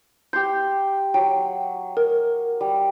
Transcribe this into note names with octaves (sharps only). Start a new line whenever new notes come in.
G4 C6 G6
F#3 G5
A#4
G3